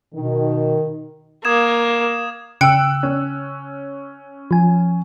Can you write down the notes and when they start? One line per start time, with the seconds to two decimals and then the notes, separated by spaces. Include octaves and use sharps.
0.14 B2 D#3
1.45 A#3 D#6 G#6 E7
2.61 C#3 G5 E6 F#6 C#7
3.03 C#4
4.51 F3 G#5